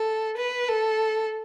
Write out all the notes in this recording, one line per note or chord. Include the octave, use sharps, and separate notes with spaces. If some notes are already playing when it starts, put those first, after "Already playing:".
Already playing: A4
B4
A4